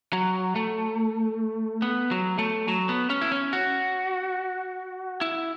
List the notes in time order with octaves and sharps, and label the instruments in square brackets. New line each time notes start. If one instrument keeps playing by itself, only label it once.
[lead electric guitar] F#3
A3
B3
F#3
A3
F#3
B3
C#4
E4
C#4
F#4
E4